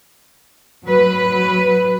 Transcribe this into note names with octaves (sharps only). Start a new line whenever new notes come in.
F#3 B4